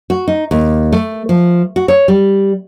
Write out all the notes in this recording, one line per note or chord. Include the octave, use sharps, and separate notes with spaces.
F#4
D#4
D#2
A3
F3
F#4
C#5
G3